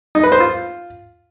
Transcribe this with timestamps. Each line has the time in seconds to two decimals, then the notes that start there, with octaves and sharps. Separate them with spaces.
0.15 D#4
0.23 B4
0.32 C5
0.40 F4